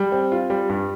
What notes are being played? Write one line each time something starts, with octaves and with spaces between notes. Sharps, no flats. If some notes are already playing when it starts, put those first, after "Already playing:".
Already playing: G3
C4
F4
G3
G2